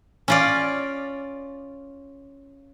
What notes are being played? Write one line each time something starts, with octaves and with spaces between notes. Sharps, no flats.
C#4 F4 D5